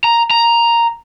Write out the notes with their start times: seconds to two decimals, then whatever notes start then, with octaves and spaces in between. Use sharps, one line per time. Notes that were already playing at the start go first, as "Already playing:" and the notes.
0.04 A#5
0.31 A#5